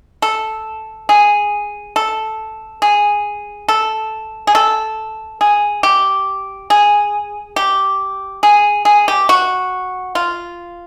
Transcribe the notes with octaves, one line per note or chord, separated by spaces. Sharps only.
A4
G#4
A4
G#4
A4
G#4
A4
G#4
G4
G#4
G4
G#4
G#4
G4
F#4
F4